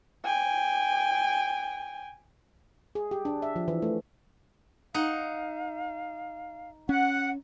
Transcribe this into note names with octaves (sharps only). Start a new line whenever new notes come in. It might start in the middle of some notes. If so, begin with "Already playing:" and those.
G5 G#5
G#4
G4
D4
E5
F3
E3
A3
D#4 F5 F#5
C#4 F#5